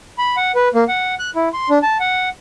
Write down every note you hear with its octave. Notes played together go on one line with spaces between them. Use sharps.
B5
F#5
B4
A#3
F#5
F#6
E4
C6
D4
A5
F#5